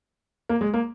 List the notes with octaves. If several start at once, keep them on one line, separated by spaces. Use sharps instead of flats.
A#3
G#3
A#3